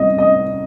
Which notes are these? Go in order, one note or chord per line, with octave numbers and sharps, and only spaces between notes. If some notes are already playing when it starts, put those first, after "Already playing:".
Already playing: C2 C3 D#5
D#5